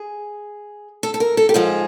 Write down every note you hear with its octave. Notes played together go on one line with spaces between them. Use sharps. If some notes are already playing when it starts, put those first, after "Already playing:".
Already playing: G#4
A4
A4
A#4
A4
G4
G#2 F3 G#3 G#4